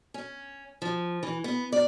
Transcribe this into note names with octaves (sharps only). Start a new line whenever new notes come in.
C#4
F3
E3
B3
D5